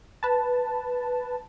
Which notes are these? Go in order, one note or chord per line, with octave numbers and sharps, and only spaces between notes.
B4 A5